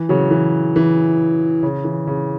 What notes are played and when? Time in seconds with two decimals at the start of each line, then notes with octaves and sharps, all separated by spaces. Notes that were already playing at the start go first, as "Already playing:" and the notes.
Already playing: E3
0.09 C#3 F#3
0.31 E3
0.76 E3
1.63 C#3
1.84 E3
2.07 C#3